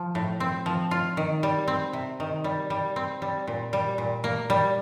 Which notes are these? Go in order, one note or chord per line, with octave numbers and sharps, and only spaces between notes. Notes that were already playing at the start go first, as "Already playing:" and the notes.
Already playing: F3
A2
C4
F3
F4
D#3
G3
C4
C3
D#3
G3
G3
C4
G3
A#2
G3
A#2
A#3
G3